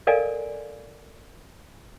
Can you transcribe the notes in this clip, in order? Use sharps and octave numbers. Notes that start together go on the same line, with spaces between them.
A4 A#4 D5 D#5 F5 G#5